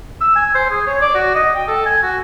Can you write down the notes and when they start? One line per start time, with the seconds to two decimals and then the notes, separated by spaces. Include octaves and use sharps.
0.21 E6
0.36 G#5
0.55 C5
0.70 G#4
0.87 C#5
1.01 D5
1.15 F#4
1.35 D#5
1.55 G5
1.68 A4
1.86 G#5
2.03 F#4